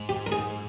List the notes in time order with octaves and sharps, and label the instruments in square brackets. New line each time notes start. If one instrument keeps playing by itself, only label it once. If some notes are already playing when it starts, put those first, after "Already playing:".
Already playing: [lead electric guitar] G#2
[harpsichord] G4
A#4
G#4